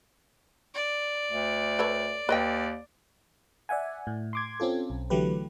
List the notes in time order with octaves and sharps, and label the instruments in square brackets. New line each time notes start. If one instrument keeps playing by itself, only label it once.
[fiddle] D5
[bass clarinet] D2
[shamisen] A4 B4 C#5
[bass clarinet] D#2 [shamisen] B4 D#5 G5
[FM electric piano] D5 E5 F#5 G#5
A2
C6 D6 G#6
C4 C#4 F4 A4
B1
D3 E3 F#3 A3 G4 B4